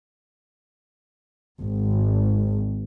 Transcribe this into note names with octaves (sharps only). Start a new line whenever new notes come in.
G#1